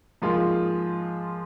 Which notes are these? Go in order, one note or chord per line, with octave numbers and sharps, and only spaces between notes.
G#2 F3 A#3 F4 G#4